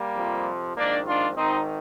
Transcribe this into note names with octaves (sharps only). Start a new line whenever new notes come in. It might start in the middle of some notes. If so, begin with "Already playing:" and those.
Already playing: G3 A#3
F2 C3 F3
A#1 G#2 D#3 A#3 D4
D4 F4
G#1 G#2 D#3 C4 D#4